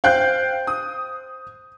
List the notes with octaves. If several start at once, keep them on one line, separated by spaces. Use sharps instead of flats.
C5 F5 G5 F#6 G6
D#6